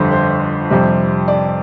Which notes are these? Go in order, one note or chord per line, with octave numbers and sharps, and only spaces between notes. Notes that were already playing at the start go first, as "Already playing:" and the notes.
Already playing: G1 F2 D3 G3 C5
C5
F2 C3 G3
D5